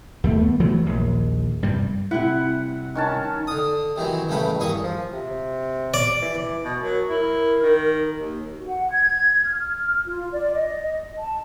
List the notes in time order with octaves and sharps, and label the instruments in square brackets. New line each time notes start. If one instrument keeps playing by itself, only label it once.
[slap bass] D#2 G3 A3
B3
E3 F#3 G3 A3
A#1 D#2
G2 C3 G3
[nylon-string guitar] C3 G3 E4 [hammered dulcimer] F#5
[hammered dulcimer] D#3 C#4 A5
[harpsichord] D3 D#6
C3 D#3 E3 F#3
A1 C#3 G3 A3 B4
E2 G2 A#3 C#6 D#6
[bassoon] F3
C3
[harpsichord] D5
[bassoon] E3
[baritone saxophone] B2
[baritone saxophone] F#3 [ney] A#4
[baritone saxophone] E4 [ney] A#4
[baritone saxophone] D#3
D#2
[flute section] F#4
F#5
G#6
F6
F4
D5
D#5
A5